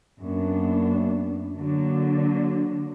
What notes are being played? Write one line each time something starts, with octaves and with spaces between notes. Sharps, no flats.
F#2 A#3 B3 D4
D3 F#3 A#3 D4